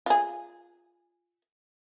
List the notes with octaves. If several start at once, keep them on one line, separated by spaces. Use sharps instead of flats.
F4 G#4